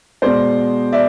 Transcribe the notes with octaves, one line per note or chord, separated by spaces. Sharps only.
B2 G#3 C5 D5
D5 E5